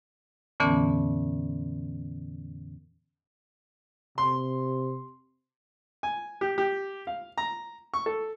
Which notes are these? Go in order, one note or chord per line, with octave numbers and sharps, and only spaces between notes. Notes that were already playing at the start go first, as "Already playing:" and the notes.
F2 A#2 D3 E3 B3 C#4
C3 C6
G#5
G4
G4
F5
A#5
C#6
A4